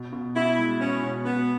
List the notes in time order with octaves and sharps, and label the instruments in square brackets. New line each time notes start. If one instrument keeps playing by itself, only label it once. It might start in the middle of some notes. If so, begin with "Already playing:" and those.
Already playing: [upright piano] B2
B2
[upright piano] B2 [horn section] E4
[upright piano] G#3
[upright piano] B3 [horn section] C#4
[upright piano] B2
[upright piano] B2 [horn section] B3